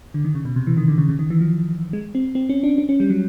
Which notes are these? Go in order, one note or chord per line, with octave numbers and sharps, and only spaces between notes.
D3
D#3
C#3
B2
C3
E3
D#3
D3
C#3
C#3
D#3
E3
F3
G#3
C4
C4
C#4
D4
D4
C#4
G3
F#3